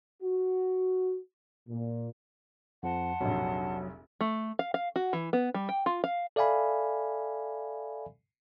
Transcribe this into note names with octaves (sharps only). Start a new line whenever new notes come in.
F#4
A#2
F2 F3 F#5 A5 C6
F1 A#1 F#3
A3
F5
F5
F#4
E3
B3
G3
G5
F4
F5
A4 D5 E5 F5 G#5 B5